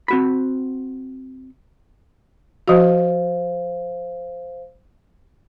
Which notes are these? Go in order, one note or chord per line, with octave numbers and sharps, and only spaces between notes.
C4 F#4 B5
F3 F#4 C5 F5